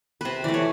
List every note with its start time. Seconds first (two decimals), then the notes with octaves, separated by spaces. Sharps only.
0.21 C3 B4 C5
0.44 E3 A3 D5
0.54 C#5